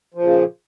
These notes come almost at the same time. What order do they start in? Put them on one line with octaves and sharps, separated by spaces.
F3 A#2 C#3